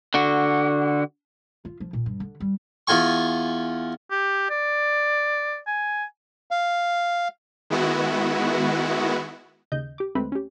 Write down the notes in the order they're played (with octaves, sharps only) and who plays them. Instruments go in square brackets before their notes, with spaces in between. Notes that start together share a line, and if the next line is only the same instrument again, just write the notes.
[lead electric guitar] D3 F#4
[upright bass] F4
F3
A#2
G2
D3
G3
[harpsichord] E2 F4 G#5 C#6
[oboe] G4
D5
G#5
[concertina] F5
[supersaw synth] D#3 G#3 B3 E4 F#4
[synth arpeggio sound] D#2 C#3 D#5 G6
G4 D6
D2 G#3 A3 C4 B4 B5
C#4 G4